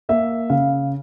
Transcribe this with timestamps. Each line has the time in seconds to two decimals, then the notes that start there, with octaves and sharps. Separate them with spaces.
0.09 A#3 E5
0.50 C#3 F5